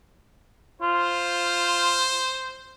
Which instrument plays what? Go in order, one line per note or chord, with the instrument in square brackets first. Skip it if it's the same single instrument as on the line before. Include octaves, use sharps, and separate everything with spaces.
[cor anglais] F4 [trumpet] C5